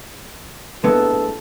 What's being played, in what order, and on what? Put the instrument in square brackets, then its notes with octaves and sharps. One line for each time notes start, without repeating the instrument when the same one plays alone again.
[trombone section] A#1 A2 A4 [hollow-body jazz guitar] G#3 B3